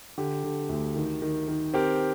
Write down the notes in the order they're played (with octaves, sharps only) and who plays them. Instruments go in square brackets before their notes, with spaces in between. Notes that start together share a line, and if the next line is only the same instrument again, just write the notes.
[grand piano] D3 G4
D3
D2
D#3
D#3
D#3
C4 G4 A#4